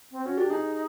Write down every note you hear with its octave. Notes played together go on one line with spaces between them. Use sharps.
C4
C#4 F#4
D4 G4
D#4 G#4